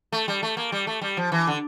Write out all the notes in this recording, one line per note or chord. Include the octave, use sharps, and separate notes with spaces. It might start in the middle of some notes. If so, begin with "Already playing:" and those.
A3
G3
A3
A#3
G3
A3
G3
F3
E3
D3